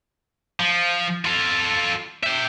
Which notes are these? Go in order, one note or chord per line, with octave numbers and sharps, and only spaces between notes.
F3
F4 A4
E5 G5